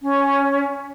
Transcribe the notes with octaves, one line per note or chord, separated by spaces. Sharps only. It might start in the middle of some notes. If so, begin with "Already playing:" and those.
C#4